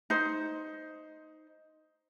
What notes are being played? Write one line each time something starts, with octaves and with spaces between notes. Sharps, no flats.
D#4 C5